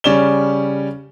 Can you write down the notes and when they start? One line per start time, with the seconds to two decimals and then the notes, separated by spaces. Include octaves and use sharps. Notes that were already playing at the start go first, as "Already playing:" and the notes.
0.04 C#3 G3 C#4 D5 E7 G7